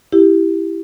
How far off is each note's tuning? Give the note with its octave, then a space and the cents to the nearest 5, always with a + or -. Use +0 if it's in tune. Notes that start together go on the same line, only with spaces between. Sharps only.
E4 +0 G4 +0